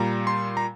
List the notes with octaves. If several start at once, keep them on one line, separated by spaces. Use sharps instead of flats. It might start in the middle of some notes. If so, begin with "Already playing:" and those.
Already playing: A#2 G3 A#5
C6
A#5